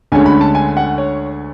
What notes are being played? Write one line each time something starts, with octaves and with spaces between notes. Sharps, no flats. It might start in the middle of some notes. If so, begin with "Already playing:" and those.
D2 D3 G#3 C#4 G#5
B5
A5
G#5
F#5
C#5